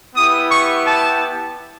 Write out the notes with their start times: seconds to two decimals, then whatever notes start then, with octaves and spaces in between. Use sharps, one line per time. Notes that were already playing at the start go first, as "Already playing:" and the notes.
0.16 B3 E4 G4 D#6
0.51 C#6
0.86 A5